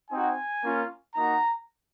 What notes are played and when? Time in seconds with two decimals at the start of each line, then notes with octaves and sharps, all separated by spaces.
0.11 C4 D#4 F#4 G#5
0.62 A#3 C#4 F4
1.15 A#3 D#4 F#4 A#5